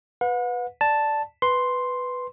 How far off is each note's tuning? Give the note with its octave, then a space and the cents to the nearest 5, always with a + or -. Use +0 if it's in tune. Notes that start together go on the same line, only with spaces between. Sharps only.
B4 +0 F#5 -40
D5 +0 A5 +0
B4 +5 C6 +0